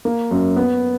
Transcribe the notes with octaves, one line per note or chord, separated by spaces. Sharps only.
A#3
F#2
B3